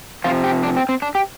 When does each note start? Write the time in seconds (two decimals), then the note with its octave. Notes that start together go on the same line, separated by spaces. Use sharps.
0.24 C3 F3 F4
0.44 G4
0.63 D4
0.77 C4
0.89 C4
1.02 D4
1.15 G4